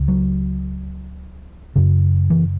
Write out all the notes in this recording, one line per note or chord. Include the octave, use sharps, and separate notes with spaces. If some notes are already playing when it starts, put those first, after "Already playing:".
Already playing: C#2 C#3
F#3
F#2 C#3
E3